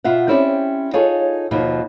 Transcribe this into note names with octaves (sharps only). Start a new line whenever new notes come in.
B2 F4 E5 F#5
C4 C#4 E4 G4 C5 D5
D#4 F4 G#4 A4 C#5
D#2 B2 D#3 F3